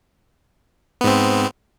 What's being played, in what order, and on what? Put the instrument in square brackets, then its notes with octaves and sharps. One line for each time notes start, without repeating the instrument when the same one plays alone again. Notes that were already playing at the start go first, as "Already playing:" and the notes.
[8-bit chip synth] B3
G#2
C4